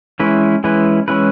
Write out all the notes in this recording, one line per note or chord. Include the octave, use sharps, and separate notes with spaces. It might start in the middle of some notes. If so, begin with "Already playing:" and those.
E3 G#3 C#4 E4 B4
E3 G#3 C#4 E4 B4
E3 G#3 C#4 E4 B4